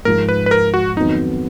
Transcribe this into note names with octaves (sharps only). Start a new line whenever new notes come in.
G#2 F3 G#3 A#4
B4
B4
A#4
F#4
F2 D#3 F#3 B3 D#4